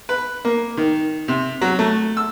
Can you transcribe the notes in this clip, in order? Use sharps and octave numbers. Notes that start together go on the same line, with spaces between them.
B4
A#3
D#3
C3
F#3
A3
E6